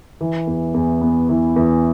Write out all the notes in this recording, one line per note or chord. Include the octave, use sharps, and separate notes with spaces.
E3
E2
E2
B3
E3
E2